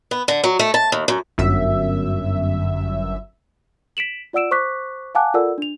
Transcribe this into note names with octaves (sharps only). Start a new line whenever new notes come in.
B3
D3
F#3
A3
A5
D#2
F#2
G1 F#2 E5
B6 D7 E7 F#7
F4 D5 F#5 E6 D7 E7
C5 C#6 D6 F#6 B6
F5 F#5 G#5 A5 D6 F#6
F4 A4 A#4 D5 F#5 E6
D4 F7